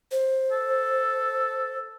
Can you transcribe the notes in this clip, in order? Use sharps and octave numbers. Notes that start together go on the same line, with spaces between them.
C5
A4